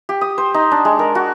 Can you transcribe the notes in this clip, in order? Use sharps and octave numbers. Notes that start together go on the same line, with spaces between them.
G4
D#6
C5
D#4
D4
G#3
A#4
F#4